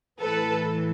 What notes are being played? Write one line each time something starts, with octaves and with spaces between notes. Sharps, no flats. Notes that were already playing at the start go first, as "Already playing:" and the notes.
A2 E3 A4 B4